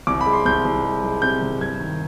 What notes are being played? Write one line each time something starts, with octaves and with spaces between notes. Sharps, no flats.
C2 D6
B5
G#3
C6
C2 G6
C2
G#3
G#3
C3 G6
C2
G2 G#6
D#3